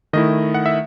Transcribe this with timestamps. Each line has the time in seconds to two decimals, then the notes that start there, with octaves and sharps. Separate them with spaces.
0.13 D#3 A3 E4 D#5
0.54 F#5
0.66 E5